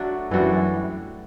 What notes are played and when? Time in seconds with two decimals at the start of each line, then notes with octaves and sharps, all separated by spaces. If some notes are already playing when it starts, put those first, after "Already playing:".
Already playing: F#3 A3 D4 F#4
0.31 F#2 E3 G3 D4 F#4